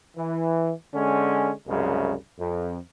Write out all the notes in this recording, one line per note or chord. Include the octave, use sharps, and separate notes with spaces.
E3
D3 G#3 C#4
C2 F#2 C#3 G#3
F2